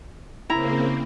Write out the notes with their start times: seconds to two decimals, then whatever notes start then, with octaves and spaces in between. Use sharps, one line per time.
0.50 C#3 A#3 C4 E4 A#5